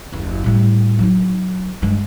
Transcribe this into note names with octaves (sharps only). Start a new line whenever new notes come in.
F#1 D#2
A2 G3
F#3 D#4
G2 G#3